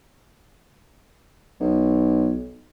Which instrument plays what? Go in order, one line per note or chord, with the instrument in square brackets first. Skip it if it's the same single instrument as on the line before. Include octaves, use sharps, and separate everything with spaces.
[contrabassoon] B1